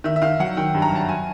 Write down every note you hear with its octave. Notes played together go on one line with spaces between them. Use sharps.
D#3 E5
E5
D#3 F5
F#3 F#5
D#3 G5
G2
A#5
F#3 A5
G#5